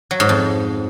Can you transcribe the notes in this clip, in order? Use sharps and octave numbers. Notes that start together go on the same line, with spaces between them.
F#3
G#2
F2